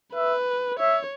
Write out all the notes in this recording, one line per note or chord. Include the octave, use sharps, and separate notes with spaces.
B4 E5
C#5 E5